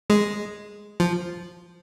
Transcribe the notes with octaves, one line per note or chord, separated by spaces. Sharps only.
G#3
F3